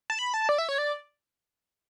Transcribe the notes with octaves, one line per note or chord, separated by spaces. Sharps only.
A5
B5
A5
D5
E5
C#5
D5